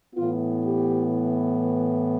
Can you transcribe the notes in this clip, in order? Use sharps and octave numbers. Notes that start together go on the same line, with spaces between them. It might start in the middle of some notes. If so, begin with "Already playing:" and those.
A2 E3 B3 F4
G4